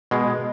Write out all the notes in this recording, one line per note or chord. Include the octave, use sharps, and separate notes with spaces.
B2 G#3